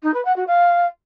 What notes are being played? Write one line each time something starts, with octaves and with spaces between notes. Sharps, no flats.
D#4
B4
F#5
F#4
F5